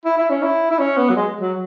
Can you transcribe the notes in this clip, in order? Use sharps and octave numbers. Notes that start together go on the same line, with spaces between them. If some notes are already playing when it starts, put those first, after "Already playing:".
E4
E4
C#4
E4
E4
C#4
B3
F#3
G#3
F#3